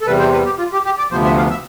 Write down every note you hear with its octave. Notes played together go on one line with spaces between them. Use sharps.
A4
E2 C3 G3 B4
C5
B4
G4
F4
G4
G4
D5
D2 C3 F3 B3 C5
E5
F5
E5